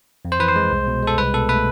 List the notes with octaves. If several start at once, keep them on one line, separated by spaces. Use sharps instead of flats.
F2
C5
E3 B4
C5
G#3
C2
B2
G#3 A4
C2 B4
B2 A4
A3 B4